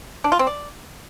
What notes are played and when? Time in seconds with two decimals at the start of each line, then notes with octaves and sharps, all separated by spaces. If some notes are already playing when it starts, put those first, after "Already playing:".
0.24 D4
0.32 F4
0.39 C4
0.47 D5